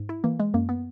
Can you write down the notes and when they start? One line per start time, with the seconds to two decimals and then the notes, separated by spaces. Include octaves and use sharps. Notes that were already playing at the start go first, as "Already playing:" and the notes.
Already playing: G#2
0.09 E4
0.24 E3 A#3
0.40 G#3
0.54 F#2 A#3
0.69 B3